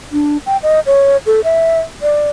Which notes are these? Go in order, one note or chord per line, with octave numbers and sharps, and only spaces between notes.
D4
G5
D#5
C#5
A4
E5
D5